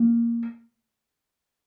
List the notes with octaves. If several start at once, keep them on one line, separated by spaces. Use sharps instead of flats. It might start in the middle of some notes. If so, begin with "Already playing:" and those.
Already playing: A#3